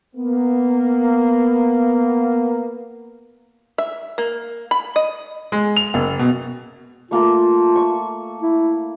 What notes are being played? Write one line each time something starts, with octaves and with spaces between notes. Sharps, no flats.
A#3 B3
E5
A#3
B5
D#5
G#3
F7
F#1
B2
A3 A#3 F4 A4
C#6
E4